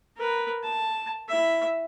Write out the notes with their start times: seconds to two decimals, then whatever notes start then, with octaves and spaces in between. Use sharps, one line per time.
0.16 A#4 B4
0.63 A5
1.28 E4 E5